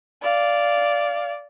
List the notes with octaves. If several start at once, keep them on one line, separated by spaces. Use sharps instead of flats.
D5 F5